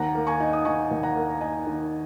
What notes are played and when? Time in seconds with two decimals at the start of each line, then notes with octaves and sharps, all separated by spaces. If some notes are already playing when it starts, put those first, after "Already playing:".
Already playing: D#2 F#5 A#5
0.15 A#3
0.27 G#5 C#6
0.40 D#4
0.53 D#6
0.65 D#3 G#5 C#6
0.91 D#2
1.03 F#5 A#5
1.16 A#3
1.41 D#4 D#5 G#5
1.67 D#3